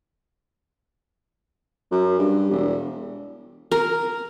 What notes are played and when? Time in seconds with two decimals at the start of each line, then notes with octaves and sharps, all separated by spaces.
1.91 F#2
2.19 G2
2.50 E1
3.72 A#4